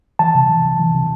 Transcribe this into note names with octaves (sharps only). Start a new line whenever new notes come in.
E3 A5
C3
E3
C3
E3
C3